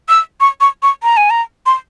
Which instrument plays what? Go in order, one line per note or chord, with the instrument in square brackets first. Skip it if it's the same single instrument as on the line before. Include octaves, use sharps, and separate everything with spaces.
[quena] E6
C#6
C#6
C#6
A#5
G#5
A#5
C6